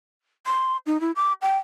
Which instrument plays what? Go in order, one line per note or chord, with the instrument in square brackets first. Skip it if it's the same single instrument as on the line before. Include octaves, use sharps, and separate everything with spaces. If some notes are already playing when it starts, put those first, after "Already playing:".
[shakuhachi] C6
D#4
E4
D6
G5